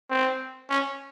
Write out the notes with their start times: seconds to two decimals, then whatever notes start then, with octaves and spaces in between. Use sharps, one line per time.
0.10 C4
0.70 C#4